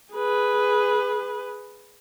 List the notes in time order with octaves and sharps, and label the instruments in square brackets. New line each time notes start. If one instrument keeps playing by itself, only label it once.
[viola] G#4 B4